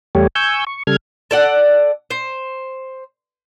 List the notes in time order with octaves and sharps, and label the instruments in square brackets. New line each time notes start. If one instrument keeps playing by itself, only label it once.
[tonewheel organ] E2 G3 A3 G4 C#5
G#5 C#6 E6 G6
C#6
C#3 G3 A4 F6 G#6
[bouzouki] A4 D5 F#5
C5